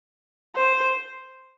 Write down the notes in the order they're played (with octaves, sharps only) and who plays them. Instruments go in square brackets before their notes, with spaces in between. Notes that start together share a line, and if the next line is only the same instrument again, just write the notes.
[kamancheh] C5